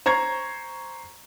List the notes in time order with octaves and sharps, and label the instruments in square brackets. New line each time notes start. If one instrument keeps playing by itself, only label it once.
[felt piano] C5 A#5 C#6 G#6